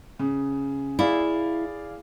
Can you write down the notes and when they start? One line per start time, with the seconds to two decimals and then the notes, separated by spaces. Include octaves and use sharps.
0.19 C#3
0.99 E4 G#4 D5 F5